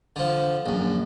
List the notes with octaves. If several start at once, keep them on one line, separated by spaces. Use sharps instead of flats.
D3 F3
A#1 F#2